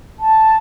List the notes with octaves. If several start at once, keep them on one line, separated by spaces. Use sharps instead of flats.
A5